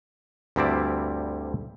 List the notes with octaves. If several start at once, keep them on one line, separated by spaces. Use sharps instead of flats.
D2 G2 G3 C4 E4 D5